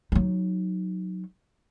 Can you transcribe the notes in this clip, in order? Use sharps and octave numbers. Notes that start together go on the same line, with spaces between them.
F#3 D#4